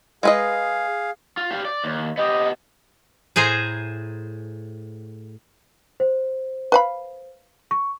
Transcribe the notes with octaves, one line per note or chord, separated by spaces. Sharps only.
G#3 G#4 B4 D#5 F5
F4
G4 F5
D5
D#2
B3 G4 D#5
A2 G#4 C5 G#5 A#5
C5
B4 F5 B5
C#6